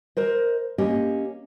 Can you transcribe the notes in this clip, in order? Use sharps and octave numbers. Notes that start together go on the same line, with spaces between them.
A#4 C5 D#5
A#3 C#4 G4 D#5